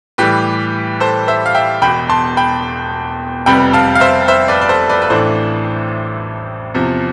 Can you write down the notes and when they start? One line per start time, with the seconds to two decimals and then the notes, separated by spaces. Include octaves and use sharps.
0.18 A2 E3 G3 G4 B4
1.00 A4 C5
1.28 C5 E5
1.46 F5
1.55 E5 G5
1.82 E1 E2 B2 G5 B5
2.10 A5 C6
2.37 G5 B5
3.46 F1 F2 C3 G3 B3 G5 B5
3.73 F5 A5
3.95 F5
4.00 C5 E5
4.28 C5 E5
4.48 B4 D5
4.61 D5
4.69 A4 C5
4.89 B4 D5
5.02 B4
5.10 A1 A2 E3 A3 D4 A4 C5
6.75 E2 C3 F3